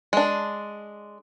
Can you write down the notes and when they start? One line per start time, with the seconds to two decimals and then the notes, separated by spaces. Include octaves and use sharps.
0.13 G#3 D4